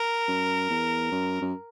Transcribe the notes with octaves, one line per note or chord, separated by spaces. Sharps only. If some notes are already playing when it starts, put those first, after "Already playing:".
Already playing: A#4
F#2
E2
F#2
F#2